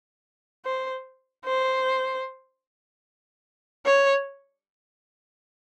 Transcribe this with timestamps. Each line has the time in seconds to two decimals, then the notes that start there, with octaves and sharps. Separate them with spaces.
0.65 C5
1.45 C5
3.86 C#5